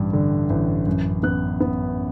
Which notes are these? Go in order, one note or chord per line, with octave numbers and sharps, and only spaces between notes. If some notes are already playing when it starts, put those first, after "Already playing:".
Already playing: A1 G2
D3
A1
F#2
B3 F#6
B3